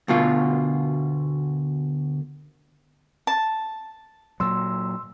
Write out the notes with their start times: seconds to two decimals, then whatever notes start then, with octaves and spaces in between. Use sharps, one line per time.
0.08 D2 B2 F4
3.27 A5
4.40 A#2 F#3 C6 E6